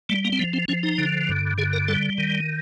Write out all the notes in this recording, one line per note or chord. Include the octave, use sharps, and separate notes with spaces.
G3 A3
A#3
C4
F3 B3
C4
F3 C#4
D#4
D3
G2
D3 G#4
A#4
G3 A4
D#3